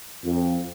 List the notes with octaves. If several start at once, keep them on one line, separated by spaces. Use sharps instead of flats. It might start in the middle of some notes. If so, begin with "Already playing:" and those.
F2